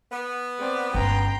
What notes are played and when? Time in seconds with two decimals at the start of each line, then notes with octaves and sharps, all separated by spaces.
0.11 B3
0.58 C4 D5 D6
0.94 G1 C#4 G5 A#5 C6